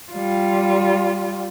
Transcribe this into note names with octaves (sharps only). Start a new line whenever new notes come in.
G3 F4